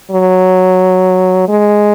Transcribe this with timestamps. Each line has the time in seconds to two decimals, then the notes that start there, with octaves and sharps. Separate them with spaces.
0.11 F#3
1.49 G#3